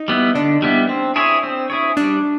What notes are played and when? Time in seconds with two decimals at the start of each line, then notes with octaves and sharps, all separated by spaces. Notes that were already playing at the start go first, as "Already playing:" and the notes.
Already playing: D#4
0.08 G3 B3 E4
0.35 D3 D4
0.62 G3 B3 E4
0.89 C4
1.16 E4 G#4 C#5
1.43 C4
1.70 E4 G#4 C#5
1.97 G3 D4